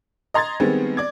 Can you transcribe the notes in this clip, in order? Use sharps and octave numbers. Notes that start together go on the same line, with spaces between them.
D#5 A#5 C6 G#6 A6
D#3 G3 G#3 B3 C4
D5 D6 G#6